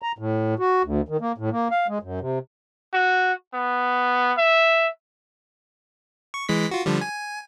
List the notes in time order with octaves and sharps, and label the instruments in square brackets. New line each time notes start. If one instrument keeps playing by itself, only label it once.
[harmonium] A#5
A2
F#4
D2
D#3
A#3
A2
A#3
F5
G#3
F#2
C3
[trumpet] F#4
B3
E5
[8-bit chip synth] C#6
E3 G#3 B6
F4 F#4
D3 F3 G3
G#5